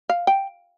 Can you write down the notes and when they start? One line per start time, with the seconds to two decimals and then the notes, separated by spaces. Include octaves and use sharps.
0.09 F5
0.27 G5